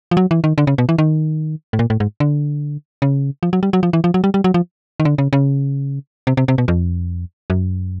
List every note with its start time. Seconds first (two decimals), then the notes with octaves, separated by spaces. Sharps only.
0.11 F3
0.17 F#3
0.31 E3
0.44 D#3
0.58 D3
0.67 C#3
0.78 B2
0.89 E3
0.98 D#3
1.73 A2
1.79 A#2
1.90 A2
2.00 G#2
2.20 D3
3.02 C#3
3.43 F3
3.53 F#3
3.63 G3
3.73 F#3
3.83 F3
3.93 E3
4.04 F3
4.14 F#3
4.24 G3
4.34 G3
4.44 F#3
4.54 F3
5.00 D#3
5.05 D3
5.18 C#3
5.33 C#3
6.27 C3
6.37 C3
6.48 C3
6.58 B2
6.68 F2
7.50 F#2